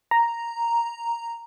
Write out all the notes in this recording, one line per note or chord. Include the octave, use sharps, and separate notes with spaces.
A#5